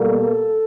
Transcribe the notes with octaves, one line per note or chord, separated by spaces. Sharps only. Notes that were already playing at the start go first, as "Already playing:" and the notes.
Already playing: B2 G3 A#3 A4